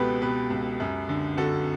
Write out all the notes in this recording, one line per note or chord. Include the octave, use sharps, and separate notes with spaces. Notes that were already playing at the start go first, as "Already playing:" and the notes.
Already playing: C#2 B2 F#4 G4 A4 B4
B2 G4 B4
C#2
F#2
D3
D3 F#4 A4